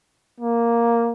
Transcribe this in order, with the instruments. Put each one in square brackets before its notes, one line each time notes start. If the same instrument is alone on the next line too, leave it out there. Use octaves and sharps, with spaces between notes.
[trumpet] A#3